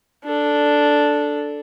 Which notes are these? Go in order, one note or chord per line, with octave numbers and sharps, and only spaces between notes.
D4 A4